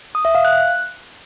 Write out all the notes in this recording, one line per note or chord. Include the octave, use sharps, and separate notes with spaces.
D#6
E5
F5
F#6